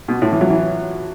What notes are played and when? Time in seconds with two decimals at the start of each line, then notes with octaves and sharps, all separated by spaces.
0.08 B2
0.22 A2
0.32 E3
0.41 F#3
0.50 E3